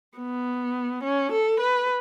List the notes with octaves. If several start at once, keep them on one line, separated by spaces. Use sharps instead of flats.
B3
C#4
A4
B4